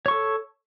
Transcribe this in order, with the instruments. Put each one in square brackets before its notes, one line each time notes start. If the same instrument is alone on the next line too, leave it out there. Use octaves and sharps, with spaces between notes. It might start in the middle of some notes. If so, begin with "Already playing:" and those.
[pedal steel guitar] C#5
C#6
A4